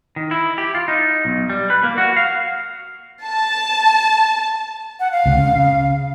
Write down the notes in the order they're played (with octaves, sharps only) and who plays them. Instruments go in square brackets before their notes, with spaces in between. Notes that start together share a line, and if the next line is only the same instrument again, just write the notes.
[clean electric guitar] D#3
E4
G4
F4
D#4
B1
G3
B4
A#3
F#4
F5
[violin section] A5
[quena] F#5
F5
[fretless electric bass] C#2 C3
C#3
C#3